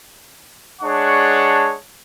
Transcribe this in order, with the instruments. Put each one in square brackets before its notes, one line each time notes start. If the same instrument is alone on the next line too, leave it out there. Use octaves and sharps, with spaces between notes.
[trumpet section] G#3 D4 C#5 F#5 A5 C#6